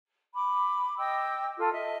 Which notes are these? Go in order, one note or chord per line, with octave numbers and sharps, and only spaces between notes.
B5 D6
D#5 G5 D6 E6
F4 A4
D#5 E5